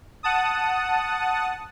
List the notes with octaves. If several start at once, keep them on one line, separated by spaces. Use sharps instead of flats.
F#5 A5 D#6